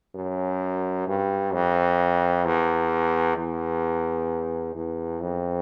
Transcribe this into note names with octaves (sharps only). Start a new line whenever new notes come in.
F#2
G2
F2
E2
E2
E2
F2